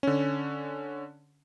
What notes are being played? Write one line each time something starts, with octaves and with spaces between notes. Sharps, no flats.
D3 C#4